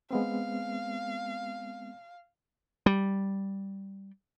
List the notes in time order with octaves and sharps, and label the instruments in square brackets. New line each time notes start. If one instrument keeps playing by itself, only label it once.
[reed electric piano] G#3 B3 C4 [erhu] F5
[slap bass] G3